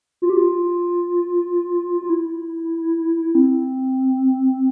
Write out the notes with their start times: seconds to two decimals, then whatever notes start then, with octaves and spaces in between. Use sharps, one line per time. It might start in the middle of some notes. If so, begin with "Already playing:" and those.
0.22 F4
0.30 G4
0.37 F4
2.01 F4
2.10 E4
3.35 C4